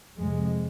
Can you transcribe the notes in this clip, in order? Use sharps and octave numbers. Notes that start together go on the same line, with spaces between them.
F2 C3 G#3